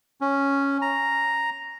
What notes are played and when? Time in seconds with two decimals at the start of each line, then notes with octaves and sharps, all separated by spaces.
0.21 C#4
0.81 A#5